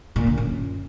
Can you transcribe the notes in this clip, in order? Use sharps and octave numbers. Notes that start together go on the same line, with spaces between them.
A#2
D3
F#2